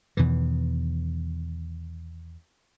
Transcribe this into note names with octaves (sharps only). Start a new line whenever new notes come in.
E2 B2 D#3 E3